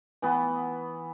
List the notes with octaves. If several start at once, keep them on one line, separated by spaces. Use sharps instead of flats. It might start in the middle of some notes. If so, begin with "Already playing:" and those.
E3 B3